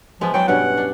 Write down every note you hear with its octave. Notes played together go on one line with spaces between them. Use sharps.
F3 G#3 B3 E4
F#3 F#4 D5 G5
G2 B2 C#4 F#5
D4